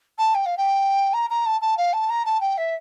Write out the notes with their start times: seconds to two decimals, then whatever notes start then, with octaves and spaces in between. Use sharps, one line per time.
0.18 A5
0.35 G5
0.46 F5
0.57 G5
1.13 A#5
1.30 A#5
1.46 A5
1.61 A5
1.77 F5
1.93 A5
2.09 A#5
2.25 A5
2.41 G5
2.57 E5